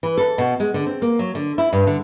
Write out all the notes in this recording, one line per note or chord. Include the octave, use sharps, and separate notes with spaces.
E3
A4
B2
G#3
D3
C4
A#3
F#3
D3
E4
G2
D3